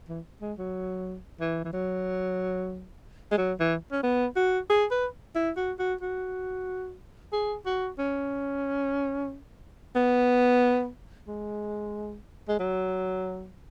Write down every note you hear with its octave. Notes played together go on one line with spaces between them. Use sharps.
E3
G#3
F#3
E3
E3
F#3
G#3
F#3
E3
C#4
B3
F#4
G#4
B4
E4
F#4
F#4
F#4
G#4
F#4
C#4
B3
G#3
G#3
F#3